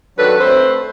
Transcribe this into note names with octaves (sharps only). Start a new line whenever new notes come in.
D#3 F#3 D4 A4 B4
A3 C4 B4 C5